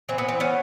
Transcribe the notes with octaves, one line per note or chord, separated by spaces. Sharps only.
E3 C4
B3
C4
B3 C#4